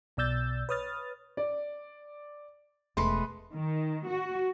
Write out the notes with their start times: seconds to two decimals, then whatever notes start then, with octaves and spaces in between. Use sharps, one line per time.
0.17 B1 B2 D5 E6 G6 A6
0.69 B4 C#5 D#6 F6 A6
1.37 D5
2.97 E1 G#3 A3 B4 C6
3.53 D#3
4.07 F#4